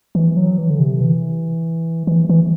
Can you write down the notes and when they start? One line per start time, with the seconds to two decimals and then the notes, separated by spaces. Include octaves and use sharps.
0.15 E3
0.37 F#3
0.58 E3
0.70 D3
0.79 C3
1.01 E3
2.07 E3
2.29 E3